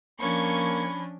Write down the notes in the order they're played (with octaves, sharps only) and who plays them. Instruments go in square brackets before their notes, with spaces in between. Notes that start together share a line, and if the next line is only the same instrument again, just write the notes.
[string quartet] F3 C#4 D4 [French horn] A#3 [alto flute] B5 [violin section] C#6 G#6